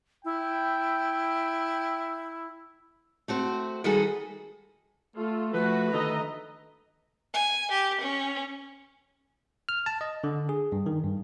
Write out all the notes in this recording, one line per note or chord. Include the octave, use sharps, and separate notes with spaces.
E4 G5
A3 C4 F#4 C5
D#3 G3 F#4 G#4 A4 B4
A3 F4 A4
F3 A3 F#4 B4
D3 D#3 A3 A4 D#5 A#5
G#5
G4
C#4
F6
A5
D#5
D3
G#4
G2
D#3
G2